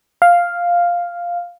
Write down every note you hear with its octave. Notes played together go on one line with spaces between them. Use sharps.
F5